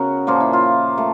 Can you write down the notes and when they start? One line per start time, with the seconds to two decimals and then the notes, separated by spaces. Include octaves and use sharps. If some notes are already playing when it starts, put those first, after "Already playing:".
Already playing: C#3 B3 F#4 A#4
0.27 A#2 F3 A#3 F4
0.40 E4
0.53 F4
0.98 A3